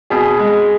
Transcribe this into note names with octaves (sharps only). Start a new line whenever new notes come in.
B2 G#4
G#3